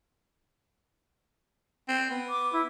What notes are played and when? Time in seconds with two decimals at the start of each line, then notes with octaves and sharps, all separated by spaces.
1.88 C4
2.10 B3
2.29 D6
2.53 E4